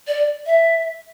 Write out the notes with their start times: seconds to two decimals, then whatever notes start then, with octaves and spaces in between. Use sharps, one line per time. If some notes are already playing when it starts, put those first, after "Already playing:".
0.07 D5
0.46 E5